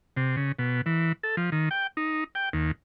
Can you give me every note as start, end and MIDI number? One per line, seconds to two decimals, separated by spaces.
0.17 0.36 48
0.37 0.52 49
0.59 0.81 47
0.86 1.12 52
1.23 1.36 69
1.37 1.50 53
1.52 1.69 51
1.71 1.87 79
1.97 2.24 63
2.35 2.49 79
2.53 2.71 39